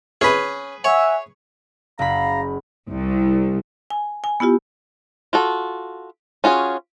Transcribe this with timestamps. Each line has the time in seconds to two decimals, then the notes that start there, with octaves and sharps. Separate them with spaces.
0.21 C#4 G#4 B4
0.84 C#5 E5 F#5 G#5
1.99 F#1 F5 A#5 B5
2.91 C2
3.90 G#5
4.24 G#5
4.40 B3 E4 F4 G4
5.33 F4 F#4 A4
6.44 C#4 F4 F#4 G#4